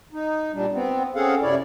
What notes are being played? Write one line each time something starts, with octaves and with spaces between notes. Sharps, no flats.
D#4
A#2 G3 D4
B3 C4
C4 C#4 G#4 A4 F5 F#5
F#2 C3 E4 C#5 D5